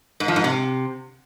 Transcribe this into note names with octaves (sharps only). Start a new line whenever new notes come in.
G#2
F3
G#2
C3